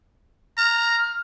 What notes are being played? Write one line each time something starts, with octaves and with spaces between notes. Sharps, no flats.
A#5 F6